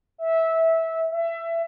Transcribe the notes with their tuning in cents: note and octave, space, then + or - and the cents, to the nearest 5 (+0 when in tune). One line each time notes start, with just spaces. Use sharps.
E5 -15
E5 +20